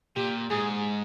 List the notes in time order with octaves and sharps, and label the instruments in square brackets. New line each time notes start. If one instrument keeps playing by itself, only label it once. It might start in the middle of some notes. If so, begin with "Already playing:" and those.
[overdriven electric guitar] A#2 [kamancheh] G4
[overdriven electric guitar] G#2 [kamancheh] G#4